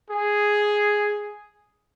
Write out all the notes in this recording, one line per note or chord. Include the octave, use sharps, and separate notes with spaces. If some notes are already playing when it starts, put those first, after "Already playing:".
G#4